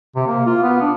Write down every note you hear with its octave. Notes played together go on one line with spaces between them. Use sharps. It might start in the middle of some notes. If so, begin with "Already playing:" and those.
C3
A#3
F4
B3
D4